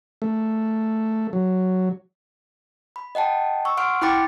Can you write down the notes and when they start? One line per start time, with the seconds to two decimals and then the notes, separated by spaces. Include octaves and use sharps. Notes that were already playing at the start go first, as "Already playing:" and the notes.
0.22 A3
1.33 F#3
2.96 B5
3.15 D#5 F#5 G5 A5
3.65 C#6 E6
3.77 F#5 C6 F6 D7
4.02 E4 G5 B5 D6 A6 C#7